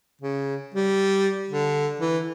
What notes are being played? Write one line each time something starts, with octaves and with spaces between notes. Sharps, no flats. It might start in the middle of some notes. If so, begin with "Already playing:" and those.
C#3
G3
D3
E3